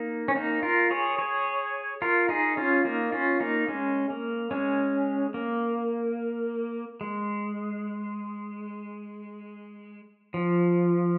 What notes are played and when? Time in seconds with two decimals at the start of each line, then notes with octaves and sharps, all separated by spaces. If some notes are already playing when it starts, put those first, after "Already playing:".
Already playing: A#3 D#4
0.28 C#4
0.35 A#3 D#4
0.63 F4 A#4
0.91 G#4 C#5
1.18 G#4 C#5
2.02 F4 A#4
2.29 D#4 G#4
2.57 C#4 F4
2.85 A#3 D#4
3.12 C#4 F4
3.40 A#3 D#4
3.68 G#3 C#4
4.10 A#3
4.51 G#3 C#4
5.34 A#3
7.01 G#3
10.34 F3